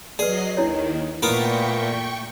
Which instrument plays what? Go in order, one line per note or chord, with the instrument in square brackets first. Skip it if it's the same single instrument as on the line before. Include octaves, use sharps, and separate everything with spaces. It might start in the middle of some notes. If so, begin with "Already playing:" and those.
[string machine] F#3 D#5 C7 [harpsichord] G#4 [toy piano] B4 D5
[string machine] D#2 D#3 [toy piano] D4 E4 C#5
[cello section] A#2 A3 [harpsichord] B3 F4 A#4 [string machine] G5 C#6